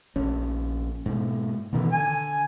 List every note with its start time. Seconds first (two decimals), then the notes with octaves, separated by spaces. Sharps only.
0.16 A#1 C#4
1.06 G#2 B2
1.73 B2 D#3 E3
1.92 D3 G#5